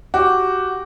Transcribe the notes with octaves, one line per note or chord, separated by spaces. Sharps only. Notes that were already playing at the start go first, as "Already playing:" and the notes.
F#4 G4